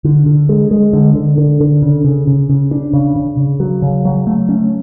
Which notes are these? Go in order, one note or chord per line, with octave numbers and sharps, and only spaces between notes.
D3
D3
G#3
G#3
D3
D3
D3
D3
C#3
C#3
C#3
C#3
D4
C#3
C#3
C#3
F#3
C#3
F#3
A3
C#4